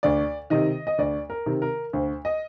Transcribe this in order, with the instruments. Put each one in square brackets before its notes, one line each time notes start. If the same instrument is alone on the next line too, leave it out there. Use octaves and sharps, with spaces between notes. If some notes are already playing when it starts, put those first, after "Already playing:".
[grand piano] D2 D5
C3 D#3 D#5
D#5
D2 D5
A#4
C3 D#3
A#4
D2 C5
D#5